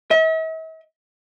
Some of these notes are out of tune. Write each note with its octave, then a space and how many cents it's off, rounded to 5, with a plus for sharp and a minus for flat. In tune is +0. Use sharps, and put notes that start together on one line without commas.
E5 -45